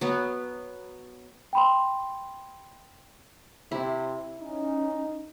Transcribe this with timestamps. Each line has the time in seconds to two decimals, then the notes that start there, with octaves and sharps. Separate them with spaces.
0.01 F#3 B3
1.53 G5 B5 C6
3.72 C3 E4
4.40 C#4 D#4